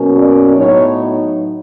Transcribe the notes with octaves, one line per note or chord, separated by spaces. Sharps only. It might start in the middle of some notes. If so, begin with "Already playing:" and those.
Already playing: B2 F#3 A#3 C#4
D5
A2 F#3 B3 D#4 C#5